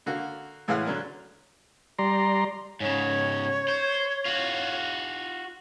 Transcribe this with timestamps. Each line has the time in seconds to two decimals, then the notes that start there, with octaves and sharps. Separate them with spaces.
0.06 D3 A#3 F#4
0.68 A2 E3 G#3 F5 F#5 F6
0.86 D3 F#3 D4
1.99 G3 D5 A#5 C6
2.80 G#2 C#3 C#5
3.68 C5
4.25 F4 F#4